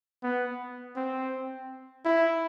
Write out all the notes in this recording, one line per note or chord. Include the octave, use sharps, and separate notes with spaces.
B3
C4
E4